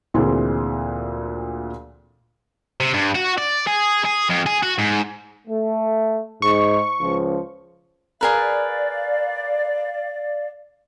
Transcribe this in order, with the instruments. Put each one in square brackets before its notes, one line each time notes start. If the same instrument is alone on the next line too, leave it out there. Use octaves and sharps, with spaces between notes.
[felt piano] D2 A#2 E3 C4 G#4 C6
[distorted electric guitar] C3
G2
F#4
D5
G#4
G#4
F2
G#4
F#4
G#2
[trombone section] A3
[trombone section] G#2 [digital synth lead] C#6
[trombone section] C#2 F3
[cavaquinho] G#4 A#4 B4 [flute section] D5 F5